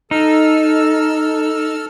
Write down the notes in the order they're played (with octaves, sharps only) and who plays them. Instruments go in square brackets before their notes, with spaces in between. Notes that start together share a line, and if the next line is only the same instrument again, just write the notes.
[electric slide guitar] D#4 [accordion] A4 E6 F6